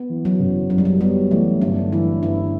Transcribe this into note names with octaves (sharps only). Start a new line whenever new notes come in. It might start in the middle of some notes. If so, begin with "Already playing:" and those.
Already playing: B3
E3
F#3
F#1
F#2 F#3
G3
F#3
G3 B3
E3 A3
G1 D4
E3 E4
G1 E4